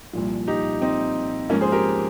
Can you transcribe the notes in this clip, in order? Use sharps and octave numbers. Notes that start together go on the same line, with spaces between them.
C2 A#2 F3
D#4 G4
C4 D#4
G#2 F3 A#3 C#4
G#4 C5
G4 A#4